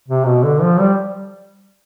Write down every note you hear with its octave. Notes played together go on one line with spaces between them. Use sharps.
C3
B2
D3
F3
G3